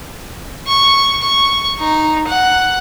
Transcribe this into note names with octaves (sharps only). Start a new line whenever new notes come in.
C#6
C#6
D#4
F#5